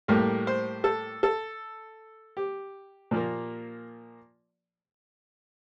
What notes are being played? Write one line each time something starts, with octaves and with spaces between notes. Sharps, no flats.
A2 G3 A#3 A#4
C5
A4
A4
G4
A#2 F3 A#3